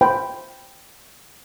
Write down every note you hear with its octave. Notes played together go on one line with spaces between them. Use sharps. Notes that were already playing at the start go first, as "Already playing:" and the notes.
C5 G5 B5